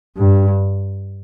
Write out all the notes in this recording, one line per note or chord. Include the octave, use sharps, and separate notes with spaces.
G2